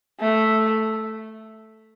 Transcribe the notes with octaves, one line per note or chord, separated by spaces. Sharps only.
A3